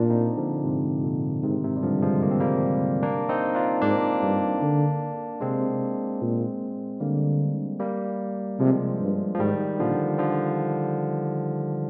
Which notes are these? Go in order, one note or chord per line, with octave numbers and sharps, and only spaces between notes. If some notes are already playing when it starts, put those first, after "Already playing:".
Already playing: A#2 D4 F4
C4 D#4
D3 F3
G#2 C3
A#2 D3
G#2 C3 D#3
G#2 C3
G3
G2 D3 F3
F3 G#3
A#3
C4
G3 A#3
A#3 D4
C4 D#4
D4 F4
G#2 A#3 D4
G2
D3
C3 G#3 C4
A#2
D3 G3 A#3
G3 A#3
C3 F3 G#3
G2
F3
G#2 D#3 G3
A#2 D3 F3
D3 F3